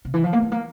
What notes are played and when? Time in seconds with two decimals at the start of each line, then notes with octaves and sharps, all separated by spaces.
0.05 C3
0.14 E3
0.24 F3
0.33 A#3
0.42 G3
0.52 A#3